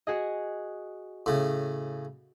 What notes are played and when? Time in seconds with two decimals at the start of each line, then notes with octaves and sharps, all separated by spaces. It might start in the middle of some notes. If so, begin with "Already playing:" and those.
0.07 F#4 G#4 D#5
1.26 A2 C#3